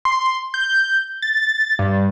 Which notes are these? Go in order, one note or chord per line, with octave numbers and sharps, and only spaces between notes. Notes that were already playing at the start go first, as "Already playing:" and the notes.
C6
G6
A6
G2